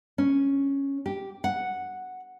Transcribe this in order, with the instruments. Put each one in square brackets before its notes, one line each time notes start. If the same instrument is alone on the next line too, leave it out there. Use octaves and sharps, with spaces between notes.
[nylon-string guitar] C#4
G4
F#5